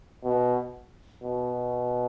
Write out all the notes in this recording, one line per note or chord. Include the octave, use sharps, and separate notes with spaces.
B2
B2